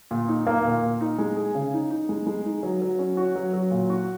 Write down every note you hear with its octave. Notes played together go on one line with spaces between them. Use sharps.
A#2
D#4
A#3
A#2
A#2
D#4
G#3
G#4
C#3
D#4
D#4
G#3
G#3
D#4
F#3
F#3
C#4
F#4
F#3
F#3
A#2
F#4